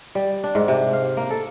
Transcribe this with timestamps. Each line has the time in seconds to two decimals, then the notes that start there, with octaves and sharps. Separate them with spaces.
0.15 G3
0.44 D4
0.55 G#2
0.68 C3
0.93 F5
1.17 A#3
1.30 A4